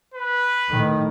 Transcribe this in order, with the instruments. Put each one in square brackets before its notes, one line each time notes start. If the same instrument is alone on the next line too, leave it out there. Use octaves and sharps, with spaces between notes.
[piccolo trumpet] B4
[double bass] A2 D#3